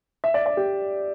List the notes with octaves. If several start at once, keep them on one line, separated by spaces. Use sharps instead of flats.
E5
D5
D5
G4